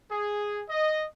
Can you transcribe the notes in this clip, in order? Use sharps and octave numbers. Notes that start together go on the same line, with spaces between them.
G#4
D#5